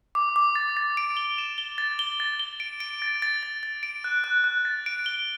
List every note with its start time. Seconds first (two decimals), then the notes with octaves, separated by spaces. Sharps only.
0.15 D6
0.36 D6
0.55 A6
0.77 A6
0.97 D7
1.17 G7
1.38 E7
1.58 G7
1.78 A6
1.99 G7
2.20 A6
2.39 G7
2.60 D7
2.80 D7
3.02 A6
3.22 A6
3.43 A6
3.63 A6
3.83 D7
4.04 F#6
4.24 F#6
4.44 F#6
4.65 A6
4.86 D7
5.06 G7